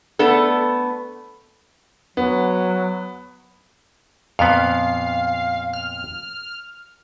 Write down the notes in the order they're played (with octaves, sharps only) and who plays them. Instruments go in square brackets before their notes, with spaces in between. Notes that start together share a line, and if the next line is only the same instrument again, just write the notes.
[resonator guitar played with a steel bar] A3 B3 D4 A4
[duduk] F#3 [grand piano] B3
[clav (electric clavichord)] F2 A#2 B3 [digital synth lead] F5
[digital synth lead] F6